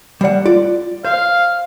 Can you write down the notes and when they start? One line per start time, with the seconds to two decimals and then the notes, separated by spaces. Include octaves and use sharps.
0.21 G3 D5 F#5 C7 C#7
0.46 F4 D5
1.05 C5 F5